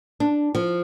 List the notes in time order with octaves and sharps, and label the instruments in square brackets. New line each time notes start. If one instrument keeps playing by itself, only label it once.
[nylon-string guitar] D4
F3